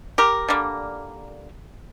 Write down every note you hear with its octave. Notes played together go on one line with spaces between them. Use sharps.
G4 A#4
D3 G3 A#3